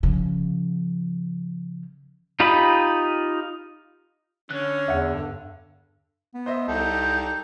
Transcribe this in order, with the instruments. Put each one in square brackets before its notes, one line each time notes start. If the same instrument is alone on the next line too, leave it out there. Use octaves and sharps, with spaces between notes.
[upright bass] C#3 F3
[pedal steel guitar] D#4 F4 G4 D#5 B5
[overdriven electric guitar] D3 [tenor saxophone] C#4 [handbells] F#6
[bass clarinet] E2 [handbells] E5 F#5
[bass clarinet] G2 [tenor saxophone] A4
[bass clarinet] B3
[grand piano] C5 D#5 E5
[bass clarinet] C2 [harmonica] D#4 G4 A4 [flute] G6